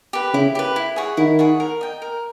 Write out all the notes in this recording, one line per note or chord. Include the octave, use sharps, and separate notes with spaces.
G4 B4
C#3 E4
G4 B4
E4
G#4 C#5 F#5
D#3 E4
G#4 C#5 F#5
A#4
D#5 G5
A#4